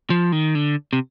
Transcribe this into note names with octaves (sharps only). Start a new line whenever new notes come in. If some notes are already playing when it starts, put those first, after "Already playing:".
F3
D#3
D3
C3